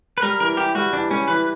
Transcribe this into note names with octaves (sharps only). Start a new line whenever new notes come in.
B4
G3 A#4
E3 A#4
E3 G4
G3 F#4
E3 D4
G3 C#4
E3 B4